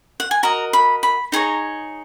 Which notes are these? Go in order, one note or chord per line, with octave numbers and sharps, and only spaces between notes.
F#5
G#5
F#4 A#4 D#5 A#5
B5
B5
D#4 G#4 C#5 A#5